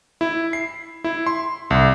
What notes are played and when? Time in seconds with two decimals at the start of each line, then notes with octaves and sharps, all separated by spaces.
0.21 E4
0.53 C7
1.04 E4
1.27 C6
1.70 C2